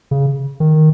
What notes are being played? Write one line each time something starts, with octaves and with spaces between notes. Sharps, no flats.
C#3
D#3